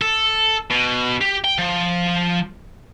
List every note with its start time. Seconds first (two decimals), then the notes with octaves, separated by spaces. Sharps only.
0.02 A4
0.70 B2
1.21 G4
1.45 G5
1.58 F3